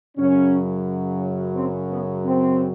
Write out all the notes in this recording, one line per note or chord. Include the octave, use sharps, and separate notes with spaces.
F#2 C#3 F#3 C#4
C4
B3
C4